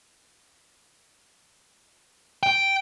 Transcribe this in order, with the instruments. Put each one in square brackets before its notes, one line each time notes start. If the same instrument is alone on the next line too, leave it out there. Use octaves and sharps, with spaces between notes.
[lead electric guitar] G5